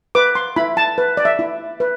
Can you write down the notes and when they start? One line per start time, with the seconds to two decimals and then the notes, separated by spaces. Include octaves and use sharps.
0.15 B4 D6
0.35 C6
0.56 E4 B5
0.77 A5
0.98 B4
1.17 D5
1.25 E5
1.39 E4
1.80 B4